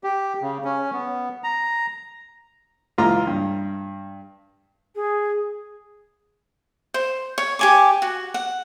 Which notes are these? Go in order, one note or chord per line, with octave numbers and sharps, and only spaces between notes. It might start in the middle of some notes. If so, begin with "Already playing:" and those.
G4
C#3
C#4
B3
A#5
C#2 E3 F4 A#5
G2
G#4
C5
C#5
G4 G#5 D6
F#4
F#5